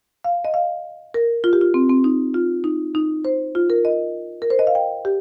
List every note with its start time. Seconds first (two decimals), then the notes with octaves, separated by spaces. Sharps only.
0.24 F5
0.45 D#5
0.54 F5
1.14 A#4
1.44 F4
1.53 G4
1.61 F4
1.74 C4
1.89 C4
2.04 D#4
2.34 F4
2.64 D#4
2.95 D#4
3.25 C5
3.55 F4
3.70 A#4
3.85 D#5
4.42 A#4
4.50 C5
4.59 D#5
4.67 F5
4.75 G5
5.05 G4